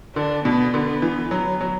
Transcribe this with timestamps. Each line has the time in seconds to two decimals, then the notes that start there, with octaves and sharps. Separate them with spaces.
0.16 D3 D4
0.45 B2 B3
0.74 D3
1.02 E3
1.31 F#3
1.61 F#3